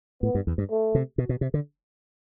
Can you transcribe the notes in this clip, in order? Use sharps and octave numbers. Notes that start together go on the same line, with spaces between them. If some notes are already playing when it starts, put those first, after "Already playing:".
A2 B3
G2
E2
G2
A3
C3
B2
B2
C3
D3